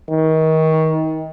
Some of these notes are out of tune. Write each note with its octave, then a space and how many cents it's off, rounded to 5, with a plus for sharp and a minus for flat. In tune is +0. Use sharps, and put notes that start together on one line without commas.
D#3 +30